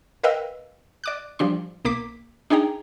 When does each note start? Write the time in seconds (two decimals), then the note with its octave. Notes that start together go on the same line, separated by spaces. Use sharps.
0.23 A#4 B4 D#5 F5 G5 E6
1.04 D5 D6 F#6
1.39 F3 G3 D4 C6
1.85 B1 A#3 D6 B6
2.50 D4 D#4 G#4 G5 A#5